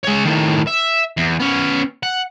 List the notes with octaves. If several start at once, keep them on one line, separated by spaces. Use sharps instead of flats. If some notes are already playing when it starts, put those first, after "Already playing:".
G#3 C#5
A2 D#3
E5
E2
B3 C#4
F#5